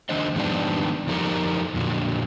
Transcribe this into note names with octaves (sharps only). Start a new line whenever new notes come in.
D#3 E3 A3 D4 C5 D#5
G#2 D#3 F3 G3 B3 D4
F2 F3 D#4 G4 A4 A#4
F2 A#2 D3 F#3